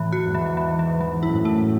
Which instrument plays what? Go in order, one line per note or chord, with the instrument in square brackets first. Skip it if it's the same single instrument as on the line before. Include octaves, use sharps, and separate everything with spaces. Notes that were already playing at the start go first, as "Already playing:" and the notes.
Already playing: [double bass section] A2 [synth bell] E3
[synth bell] F#4
[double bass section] E2 G#2
[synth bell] E3
E3
E3
E3
[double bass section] F#2 A2 [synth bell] E4
[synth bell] A3